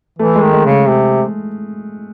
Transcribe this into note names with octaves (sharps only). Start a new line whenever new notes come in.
E3 A3
G#3
D#3
G#3
C#3
G#3
C3